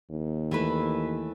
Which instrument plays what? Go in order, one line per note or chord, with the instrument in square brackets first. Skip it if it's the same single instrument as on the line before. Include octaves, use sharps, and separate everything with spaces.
[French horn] D#2
[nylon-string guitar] E3 A3 B4